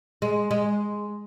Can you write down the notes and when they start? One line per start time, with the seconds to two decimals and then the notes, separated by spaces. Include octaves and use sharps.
0.22 G#3
0.51 G#3